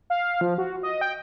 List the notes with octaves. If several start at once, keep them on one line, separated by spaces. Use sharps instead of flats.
F5
F3
F#4
D#5
G5